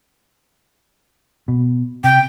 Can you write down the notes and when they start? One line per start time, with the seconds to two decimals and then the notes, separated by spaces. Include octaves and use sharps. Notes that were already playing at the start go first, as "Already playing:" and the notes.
1.48 B2
2.04 C3 G5